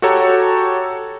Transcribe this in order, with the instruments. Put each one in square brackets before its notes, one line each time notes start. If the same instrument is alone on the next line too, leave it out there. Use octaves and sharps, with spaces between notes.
[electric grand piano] F#4 G4 A4 C#5 A#5